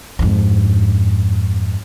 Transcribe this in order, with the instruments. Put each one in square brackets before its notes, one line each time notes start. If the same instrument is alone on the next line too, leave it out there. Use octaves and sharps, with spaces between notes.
[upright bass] F2 G#2